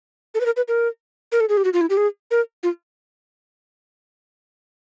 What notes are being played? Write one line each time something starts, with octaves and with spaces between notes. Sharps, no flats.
A4
B4
A#4
B4
A#4
A#4
A4
G#4
G4
F#4
F4
E4
G4
G#4
A#4
F4